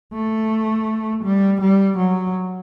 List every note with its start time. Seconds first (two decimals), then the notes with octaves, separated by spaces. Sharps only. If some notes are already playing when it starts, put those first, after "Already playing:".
0.14 A3
1.24 G3
1.61 G3
1.97 F#3